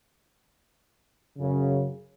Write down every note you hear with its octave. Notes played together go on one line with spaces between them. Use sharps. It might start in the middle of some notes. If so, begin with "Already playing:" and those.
F#2 C#3